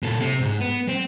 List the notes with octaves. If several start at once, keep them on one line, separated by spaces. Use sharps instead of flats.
A#2 A4
C3
G#2
B3
C4